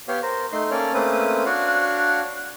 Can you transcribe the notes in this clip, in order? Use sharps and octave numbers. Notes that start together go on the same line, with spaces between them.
B3 G4 C#5 F5
A#4 C5
A3 D#4 C6
A#3 C#4 A4 C#5 D5 F6
A3 A#3 C4 C#4 B4 D#6
D4 F#4 C#5 F5 F#5